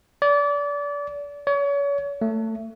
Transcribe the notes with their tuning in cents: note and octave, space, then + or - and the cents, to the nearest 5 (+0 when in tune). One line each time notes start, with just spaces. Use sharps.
D5 -30
C#5 +35
A3 +20